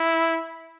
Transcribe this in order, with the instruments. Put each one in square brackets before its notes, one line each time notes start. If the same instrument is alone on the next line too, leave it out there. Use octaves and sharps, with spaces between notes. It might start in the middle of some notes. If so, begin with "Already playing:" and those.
Already playing: [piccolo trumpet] E4